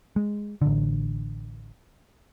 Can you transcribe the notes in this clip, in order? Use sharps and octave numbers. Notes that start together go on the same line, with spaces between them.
G#3
A1 D3